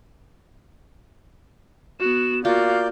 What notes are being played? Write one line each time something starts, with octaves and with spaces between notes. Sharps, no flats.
B3 F#4 E7
A#3 F4 F#4 D5 F5 G6